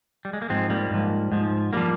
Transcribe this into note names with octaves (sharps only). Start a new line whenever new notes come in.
G3
G#3
A#3
G#2 F3 G#3 C4
G3 A#3
G#2 F3
G#2 F3
F3 G3 A#3